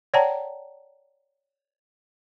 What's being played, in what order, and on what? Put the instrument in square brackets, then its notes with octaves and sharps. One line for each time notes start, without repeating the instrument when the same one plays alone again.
[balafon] C#5 D5 F#5 G5 A5 A#5